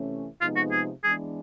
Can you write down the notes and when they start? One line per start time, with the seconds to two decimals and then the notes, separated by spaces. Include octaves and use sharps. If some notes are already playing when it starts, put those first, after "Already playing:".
Already playing: C3 E3 A3 C#4
0.41 C3 F3 G#3 B3 D#4 F4
0.56 F#4
0.72 G#4
1.04 E3 G#3 B3 D4 G#4